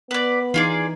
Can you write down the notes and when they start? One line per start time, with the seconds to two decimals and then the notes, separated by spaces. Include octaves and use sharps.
0.11 B3 B4 D5
0.54 E3 D#4 F4 G#4 D5